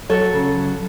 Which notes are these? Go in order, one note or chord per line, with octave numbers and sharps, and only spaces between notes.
F#3 A4 C#5
C#3
F#3